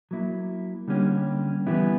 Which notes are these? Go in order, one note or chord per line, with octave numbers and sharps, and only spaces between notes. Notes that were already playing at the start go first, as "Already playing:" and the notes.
F#3 A#3 E4
D3 G3 A#3 C#4 G4
E3 G3 B3 E4